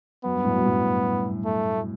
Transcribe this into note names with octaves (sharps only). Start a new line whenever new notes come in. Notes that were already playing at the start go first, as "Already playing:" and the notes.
F#2 B3
G2
F#2 A2
G2 B2
F#2 A2
A3